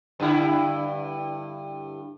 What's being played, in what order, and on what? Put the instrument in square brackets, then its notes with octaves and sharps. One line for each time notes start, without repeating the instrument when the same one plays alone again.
[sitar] G2 D3 E4